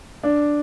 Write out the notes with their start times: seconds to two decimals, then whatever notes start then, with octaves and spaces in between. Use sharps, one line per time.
0.23 D4